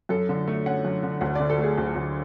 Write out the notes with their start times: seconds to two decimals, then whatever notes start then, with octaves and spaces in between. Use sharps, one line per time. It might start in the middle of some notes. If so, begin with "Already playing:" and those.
0.09 F#2 A4
0.29 D3
0.48 A3
0.66 C#4 F#5
0.85 F#2
1.03 D3
1.21 D2 F#5
1.35 D3 D5
1.50 A4
1.58 A3 G#4
1.78 D2
1.95 D2